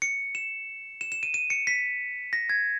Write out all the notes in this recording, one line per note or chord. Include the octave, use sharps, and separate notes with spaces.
C#7
E7
E7
E7
D#7
D#7
C#7
B6
A#6
G#6